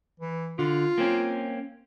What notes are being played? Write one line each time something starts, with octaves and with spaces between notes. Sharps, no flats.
E3
D3 F4
A#3 C4 C#4